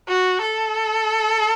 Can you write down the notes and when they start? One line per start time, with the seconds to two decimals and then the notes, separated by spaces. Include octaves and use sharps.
0.08 F#4
0.42 A4